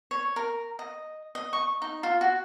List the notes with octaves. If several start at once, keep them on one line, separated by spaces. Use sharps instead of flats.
C#5
A#4
D#5
D#5
C#6
D#4
F4
F#4